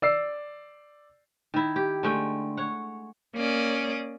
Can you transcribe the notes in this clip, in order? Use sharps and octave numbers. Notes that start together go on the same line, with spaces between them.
D5 E6 C7
D#3 E4
G4
D3 G#3 A3 G5
C#5 F#5
A#3 C#4 D5 D#6